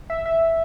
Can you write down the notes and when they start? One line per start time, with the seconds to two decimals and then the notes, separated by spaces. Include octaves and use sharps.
0.10 E5
0.25 E5